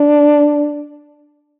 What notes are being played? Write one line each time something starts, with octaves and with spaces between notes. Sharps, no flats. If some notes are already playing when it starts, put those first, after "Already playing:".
Already playing: D4